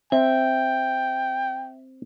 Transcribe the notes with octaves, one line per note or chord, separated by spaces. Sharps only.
C4 E5 G5